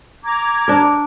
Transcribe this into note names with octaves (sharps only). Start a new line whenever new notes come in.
A#5 D6 G#6
D4 A#4